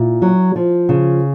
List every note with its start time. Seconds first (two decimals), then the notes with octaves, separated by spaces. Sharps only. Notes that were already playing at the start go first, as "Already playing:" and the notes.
Already playing: A#2 E4
0.22 F#3
0.56 F3
0.89 C#3